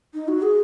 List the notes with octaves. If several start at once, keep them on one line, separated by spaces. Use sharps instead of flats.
D#4
F#4
G#4